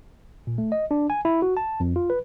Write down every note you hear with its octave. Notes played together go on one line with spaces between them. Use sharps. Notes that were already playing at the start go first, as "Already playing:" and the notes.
A#2
A3
D#5
D4
G#5
E4
F#4
A5
F2
F4
B4